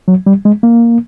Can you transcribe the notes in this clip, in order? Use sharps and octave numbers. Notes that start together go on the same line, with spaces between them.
F#3
G3
G#3
A#3